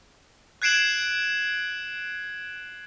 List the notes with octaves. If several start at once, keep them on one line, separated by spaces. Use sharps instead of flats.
F#6 G#6 C7 D7 E7 F#7